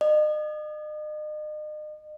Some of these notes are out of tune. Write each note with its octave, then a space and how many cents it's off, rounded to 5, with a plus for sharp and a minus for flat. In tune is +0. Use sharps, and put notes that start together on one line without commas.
D#5 -40